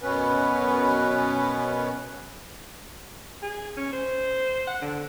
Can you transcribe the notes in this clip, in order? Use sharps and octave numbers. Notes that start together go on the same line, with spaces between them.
F#2 B2 B3 C#4 B4
G#4
C#4
C5
F#5
D3